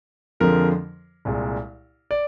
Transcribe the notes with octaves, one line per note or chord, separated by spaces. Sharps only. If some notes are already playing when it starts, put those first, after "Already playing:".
F2 D3 F3 G#3 A#4
C2 A#2 G#3
D5